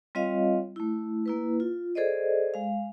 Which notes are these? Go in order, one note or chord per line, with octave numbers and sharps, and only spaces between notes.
G3 C4 F4 C#5 D#5 F5
A3 E4
A#3 E4 B4
F4
G#4 A4 C5 D5 D#5
G#3 F5